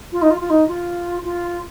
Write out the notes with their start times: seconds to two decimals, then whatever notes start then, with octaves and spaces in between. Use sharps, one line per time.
0.12 F4
0.22 D#4
0.31 F4
0.41 F4
0.50 D#4
0.68 F4
1.25 F4